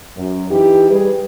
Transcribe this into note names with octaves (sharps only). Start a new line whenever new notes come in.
F#2
E3 D#4 G4
G3 G#4 B4